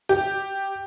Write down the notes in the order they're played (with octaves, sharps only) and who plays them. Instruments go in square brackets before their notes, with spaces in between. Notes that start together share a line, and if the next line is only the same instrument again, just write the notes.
[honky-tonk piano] G4